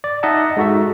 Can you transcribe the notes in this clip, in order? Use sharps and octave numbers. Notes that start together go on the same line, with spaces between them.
D5
D#4 D#5 E5 F#5 A5
G#3 D#4 F#4 A4 E5